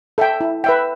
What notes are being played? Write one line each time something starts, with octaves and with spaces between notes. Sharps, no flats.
A4 E5 G5
E4
B4 E5 G5